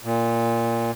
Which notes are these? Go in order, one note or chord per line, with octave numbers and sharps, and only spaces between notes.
A#2